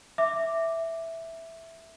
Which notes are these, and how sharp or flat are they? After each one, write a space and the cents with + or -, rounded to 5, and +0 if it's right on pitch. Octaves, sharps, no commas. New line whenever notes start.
E5 +0 D6 +0